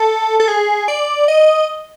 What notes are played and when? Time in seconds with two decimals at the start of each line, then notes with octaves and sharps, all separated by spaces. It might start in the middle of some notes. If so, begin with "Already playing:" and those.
Already playing: A4
0.40 A4
0.48 G#4
0.88 D5
1.28 D#5